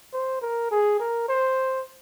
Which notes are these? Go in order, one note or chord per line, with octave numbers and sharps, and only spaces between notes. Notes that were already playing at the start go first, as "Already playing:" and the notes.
C5
A#4
G#4
A#4
C5